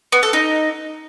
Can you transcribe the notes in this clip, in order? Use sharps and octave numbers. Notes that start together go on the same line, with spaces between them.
B3
A4
D#4